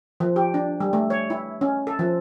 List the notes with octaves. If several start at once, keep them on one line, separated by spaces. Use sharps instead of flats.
F3
G4
D4
G3
A3
C#5
E4
C#4
A4
F3